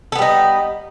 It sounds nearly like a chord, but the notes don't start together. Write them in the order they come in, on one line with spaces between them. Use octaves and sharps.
A4 B3 G3 D#4